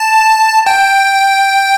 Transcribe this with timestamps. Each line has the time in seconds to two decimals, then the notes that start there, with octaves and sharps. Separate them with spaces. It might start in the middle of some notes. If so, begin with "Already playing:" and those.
Already playing: A5
0.66 G5